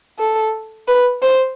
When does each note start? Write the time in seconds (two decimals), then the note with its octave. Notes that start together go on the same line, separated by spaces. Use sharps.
0.19 A4
0.88 B4
1.22 C5